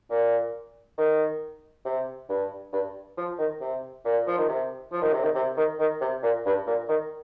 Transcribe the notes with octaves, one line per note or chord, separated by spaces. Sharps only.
A#2
D#3
C3
G2
G2
F3
D#3
C3
A#2
F3
D#3
C3
F3
D#3
C3
D#3
C3
D#3
D#3
C3
A#2
G2
A#2
D#3